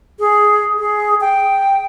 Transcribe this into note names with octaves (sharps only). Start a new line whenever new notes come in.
G#4
G#4
G5